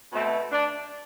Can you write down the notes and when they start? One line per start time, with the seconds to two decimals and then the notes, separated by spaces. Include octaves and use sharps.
0.12 B2 A3 C4
0.52 D4